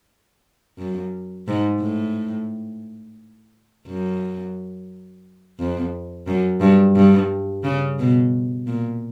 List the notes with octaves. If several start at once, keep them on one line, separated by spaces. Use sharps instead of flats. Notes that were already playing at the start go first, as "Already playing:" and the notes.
F#2
G#2
A2
F#2
F2
F#2
G2
G2
C#3
B2
A#2